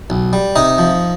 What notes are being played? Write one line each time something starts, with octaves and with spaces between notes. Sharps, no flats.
B1
G3
C3 D#4 D#5
F3